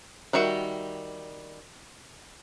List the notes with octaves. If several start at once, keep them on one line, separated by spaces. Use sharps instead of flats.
D#3 G3 F#4 E5